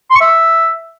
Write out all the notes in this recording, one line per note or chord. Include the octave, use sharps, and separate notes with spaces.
C6
C#6
E5